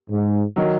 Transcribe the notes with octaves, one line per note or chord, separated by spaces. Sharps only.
G#2
D#3 F#3